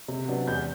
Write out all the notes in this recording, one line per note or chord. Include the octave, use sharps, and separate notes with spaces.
C3
F#3 B3 D4
E2 G6